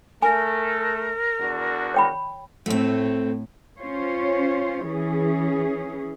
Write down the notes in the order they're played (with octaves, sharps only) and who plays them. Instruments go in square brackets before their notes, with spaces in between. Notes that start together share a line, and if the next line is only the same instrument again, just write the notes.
[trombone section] A3 [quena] A#4 [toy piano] G#5
[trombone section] E2 D4 F#4
[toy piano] C#5 G5 B5
[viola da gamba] A2 [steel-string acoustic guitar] A3 C4
[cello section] C#4 F4 C5 C#5
E3 C#4 G#4